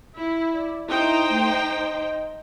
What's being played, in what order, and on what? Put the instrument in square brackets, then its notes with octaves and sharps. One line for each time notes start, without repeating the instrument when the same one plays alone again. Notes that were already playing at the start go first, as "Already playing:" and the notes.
[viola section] E4
[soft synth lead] D5
[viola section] D#4 C5 G5 [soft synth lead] E4
[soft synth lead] A3
D#5